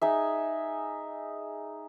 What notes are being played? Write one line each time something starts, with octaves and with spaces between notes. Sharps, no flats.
D#4 G#4 E5